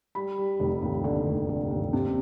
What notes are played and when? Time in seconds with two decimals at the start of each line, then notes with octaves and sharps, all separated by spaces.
0.15 G3 B5
0.38 G3
0.60 F1
0.82 D#2
1.04 D3
1.26 F1
1.49 D3
1.70 D#2
1.93 C3